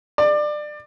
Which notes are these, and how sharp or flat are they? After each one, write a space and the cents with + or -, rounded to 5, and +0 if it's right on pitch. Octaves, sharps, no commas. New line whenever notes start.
D5 +25